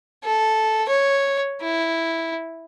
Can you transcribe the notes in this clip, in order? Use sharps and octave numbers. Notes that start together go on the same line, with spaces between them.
A4
C#5
E4